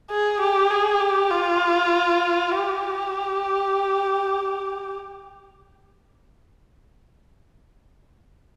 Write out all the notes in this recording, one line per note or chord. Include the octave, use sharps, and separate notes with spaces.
G#4
G4
G#4
G4
F4
G4